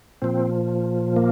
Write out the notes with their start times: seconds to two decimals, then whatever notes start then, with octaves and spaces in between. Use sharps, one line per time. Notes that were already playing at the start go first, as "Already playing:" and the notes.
0.22 A#2 F3 C4
1.16 A#3